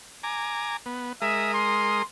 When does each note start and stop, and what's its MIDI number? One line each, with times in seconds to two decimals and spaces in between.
0.23 0.77 80
0.23 0.77 82
0.23 0.77 86
0.86 1.13 59
1.22 2.02 56
1.22 2.02 70
1.22 1.52 76
1.22 2.02 87
1.54 2.04 84